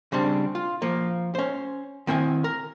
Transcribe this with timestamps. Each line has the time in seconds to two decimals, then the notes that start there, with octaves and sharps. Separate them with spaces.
0.12 C#3 G3 C4 D4
0.55 F4
0.82 F3 A#3
1.35 C#4 C5
2.07 D#3 C4 E4 F#5 G#5
2.44 A#4